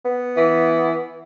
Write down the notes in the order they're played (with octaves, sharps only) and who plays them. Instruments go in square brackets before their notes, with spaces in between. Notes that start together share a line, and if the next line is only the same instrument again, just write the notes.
[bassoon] B3
[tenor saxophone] E3